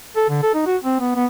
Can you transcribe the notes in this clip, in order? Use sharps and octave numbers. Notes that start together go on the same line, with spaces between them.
A4
D3
A4
D#4
F#4
C4
B3
B3